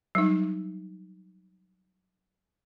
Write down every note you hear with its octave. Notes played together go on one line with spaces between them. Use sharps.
F#3 G3 D#4